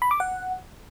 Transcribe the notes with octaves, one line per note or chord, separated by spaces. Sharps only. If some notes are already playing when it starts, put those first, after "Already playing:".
B5
D6
F#5